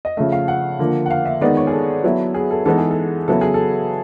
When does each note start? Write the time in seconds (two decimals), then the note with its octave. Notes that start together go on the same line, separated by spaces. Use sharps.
0.05 D#5
0.17 C#3 F3 A3 E5
0.32 F5
0.48 F#5
0.79 D3 F3 A#3
1.06 F#5
1.11 F5
1.25 E5
1.41 D#3 G#3 B3 D#4 D5
1.57 C#5
1.67 G#4
1.72 A4
2.04 F#3 B3 E4
2.34 G#4
2.51 A4
2.66 E3 G#3 B3 D#4 A4
2.78 G#4
2.91 A4
3.28 C#3 F#3 B3 E4 A4
3.41 G#4
3.54 A4